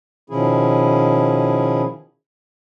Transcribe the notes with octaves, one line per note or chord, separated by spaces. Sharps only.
B2 D#3 F3 C#4 E4 G#4